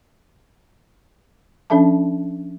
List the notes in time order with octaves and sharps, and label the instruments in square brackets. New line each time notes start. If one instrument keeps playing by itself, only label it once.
[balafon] F3 C#4 D4 A4 E5 A5